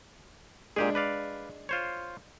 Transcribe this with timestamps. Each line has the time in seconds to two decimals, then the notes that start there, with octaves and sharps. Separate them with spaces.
0.76 A#2 G#3 D4 G4 G#4
0.95 B4 D5 F5
1.69 F4 C5 C#5